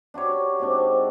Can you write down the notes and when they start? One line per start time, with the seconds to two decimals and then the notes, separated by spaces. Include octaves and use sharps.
0.14 D4 F#4 G4 C#5
0.59 G#2 C4 D4